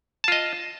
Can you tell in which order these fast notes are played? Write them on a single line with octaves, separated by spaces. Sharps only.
A5 F4 D#5